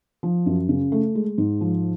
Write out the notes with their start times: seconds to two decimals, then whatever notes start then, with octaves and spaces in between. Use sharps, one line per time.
0.23 F3
0.46 F#2
0.69 C#3
0.92 A3
1.15 G#3
1.38 G#2
1.61 F3